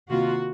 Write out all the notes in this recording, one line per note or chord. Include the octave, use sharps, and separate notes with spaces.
C3 D#3 A#3 F4 F#4